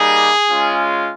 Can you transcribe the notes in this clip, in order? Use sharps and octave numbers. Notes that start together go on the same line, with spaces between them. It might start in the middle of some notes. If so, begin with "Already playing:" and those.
Already playing: G3 A#3 D#4 G#4
G#3 C#4 F4